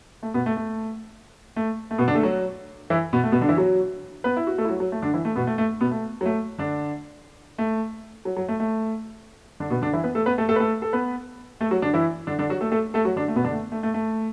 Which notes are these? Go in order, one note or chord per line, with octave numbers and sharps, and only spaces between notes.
A3
B2 B3
A3
A3
A3
A3
B2 B3
D3 D4
A3 A4
F#3 F#4
E3 E4
B2 B3
A3
B2 B3
D3 D4
E3 E4
F#3 F#4
B3 B4
E4
F#4
A3 A4
E4
F#3 F#4
F#3
A3
D3 D4
E3 E4
A3
B2 B3
A3
A3
B2 B3
A3
F#3
A3
D3 D4
A3
F#3
F#3
A3
A3
D3 D4
B2 B3
D3 D4
E3 E4
B3 B4
A3 A4
B3 B4
A3 A4
A3 A4
B4
A3 A4
A4
B3 B4
A3 A4
F#3 F#4
D3 D4
E3 E4
D3 D4
D3 D4
F#3 F#4
A3 A4
A3 A4
A3 A4
F#3 F#4
D3 D4
A3
B2 B3
D3 D4
A3
A3
A3
A3